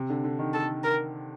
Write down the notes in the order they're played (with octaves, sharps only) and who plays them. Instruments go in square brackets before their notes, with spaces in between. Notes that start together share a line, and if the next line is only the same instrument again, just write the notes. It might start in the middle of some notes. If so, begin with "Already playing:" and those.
Already playing: [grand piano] C3
D3
D3
D#3
[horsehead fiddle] A4
A#4